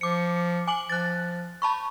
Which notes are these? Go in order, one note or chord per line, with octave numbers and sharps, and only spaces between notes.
F3 D6 C#7
G#5 D6 F#7
F3 F#6 A6
A5 B5 C#6